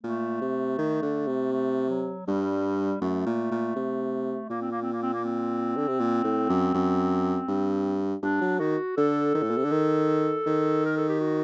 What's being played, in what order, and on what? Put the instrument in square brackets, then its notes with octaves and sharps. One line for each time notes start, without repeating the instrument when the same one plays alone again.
[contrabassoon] A#2 [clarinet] A3
[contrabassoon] C3
D#3
D3
C3
[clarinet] A3
F#3
[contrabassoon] G2 [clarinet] G3
[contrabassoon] F#2 [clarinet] A3
[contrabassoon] A#2
A#2
C3
[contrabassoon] A#2 [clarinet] A#3
[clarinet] C4
A#3
C4
A#3
C4
A#3
C4
[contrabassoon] D3
C3
A#2
A2
F#2
F#2
G2
[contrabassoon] G2 [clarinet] D4
[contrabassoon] F#3
[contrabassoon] D#3 [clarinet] F#4
[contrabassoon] D3 [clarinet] A4
[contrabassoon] D#3
A2
A#2
C3
D3
D#3
D#3
[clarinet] A#4
A4
G4
F#4